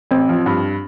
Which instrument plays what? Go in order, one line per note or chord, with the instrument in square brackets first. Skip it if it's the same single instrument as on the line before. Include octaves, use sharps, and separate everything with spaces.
[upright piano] A1 [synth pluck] C4
[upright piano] F3
G2